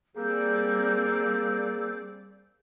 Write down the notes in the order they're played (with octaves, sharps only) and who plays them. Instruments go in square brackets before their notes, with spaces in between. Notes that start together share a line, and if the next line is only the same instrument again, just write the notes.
[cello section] G3 C4 D5 [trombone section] A#3 [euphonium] G#4 [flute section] E6 G6